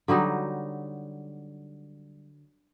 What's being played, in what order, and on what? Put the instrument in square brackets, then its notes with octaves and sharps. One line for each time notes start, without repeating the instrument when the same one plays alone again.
[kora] D3 F#3 G3 D#4